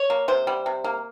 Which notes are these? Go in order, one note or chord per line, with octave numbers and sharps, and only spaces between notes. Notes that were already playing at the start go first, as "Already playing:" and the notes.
Already playing: C#5
A#3
C3 C5
G3
C3
A#3